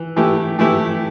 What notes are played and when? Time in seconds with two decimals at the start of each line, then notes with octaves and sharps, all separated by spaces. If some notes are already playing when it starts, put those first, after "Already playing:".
Already playing: E3
0.16 E3 A3 E4 G4
0.59 E3 A3 E4 G4